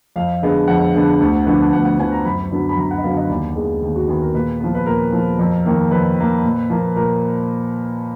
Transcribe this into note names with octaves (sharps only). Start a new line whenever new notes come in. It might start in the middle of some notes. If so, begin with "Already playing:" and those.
F2 F5
D3 G#3 B3
F2 F#5
D3 G#3 B3
D2
D3 F3 B3
D2 F#5
F#5
D3 F3 B3 G#5
A#5
F#2 B5
D3 F#3 B3
B5
F#2 A#5
F#5
D#5
D3 F#3 B3 F5
D#5
D#2 D5
D#3 G#3 B3
D#2
F#4
D#3 G#3 B3 G#4
A#4
A#2 B4
F3 B3
B4
A#2 A#4
F3 B3
F2
D#3 A#3
F2 B4
D#3 A#3
A#2
F3 A#3
A#2 A#4